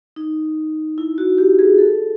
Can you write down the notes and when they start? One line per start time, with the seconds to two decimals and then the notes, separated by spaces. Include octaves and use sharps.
0.16 D#4
0.98 E4
1.18 F#4
1.38 G4
1.59 G#4
1.78 A4